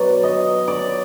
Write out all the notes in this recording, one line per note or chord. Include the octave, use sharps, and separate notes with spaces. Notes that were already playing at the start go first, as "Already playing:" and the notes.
Already playing: B2 F#3 D5
D#5
D5